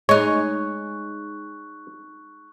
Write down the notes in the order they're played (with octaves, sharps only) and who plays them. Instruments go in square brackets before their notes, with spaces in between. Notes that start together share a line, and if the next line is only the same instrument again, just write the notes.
[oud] G#3 D#4 [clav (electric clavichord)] C#5 [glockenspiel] C#6 F#6